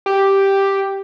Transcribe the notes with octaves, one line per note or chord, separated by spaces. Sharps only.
G4